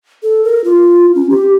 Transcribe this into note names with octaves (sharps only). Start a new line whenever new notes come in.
A4
A#4
F4
C#4
G4